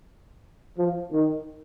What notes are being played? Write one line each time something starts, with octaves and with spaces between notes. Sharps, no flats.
F3
D#3